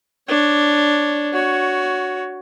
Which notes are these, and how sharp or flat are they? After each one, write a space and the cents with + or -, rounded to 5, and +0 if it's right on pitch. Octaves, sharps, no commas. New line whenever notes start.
D4 +0 C#5 +0
F#4 +0 C#5 +15